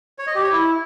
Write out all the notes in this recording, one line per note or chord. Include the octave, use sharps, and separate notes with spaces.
C#5
D#5
G4
C#5
E4